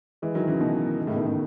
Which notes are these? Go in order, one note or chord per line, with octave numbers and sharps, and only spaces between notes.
E3 G#3
D#3 F#3
C#3 E3
B2 D#3
D#3
A2 C#3
B2 D#3
A2 C#3